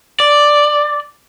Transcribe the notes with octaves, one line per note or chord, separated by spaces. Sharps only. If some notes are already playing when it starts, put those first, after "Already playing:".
D5